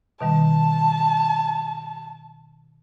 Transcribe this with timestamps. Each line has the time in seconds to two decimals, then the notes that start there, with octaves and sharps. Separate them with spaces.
0.21 B2 D#3 G3 A5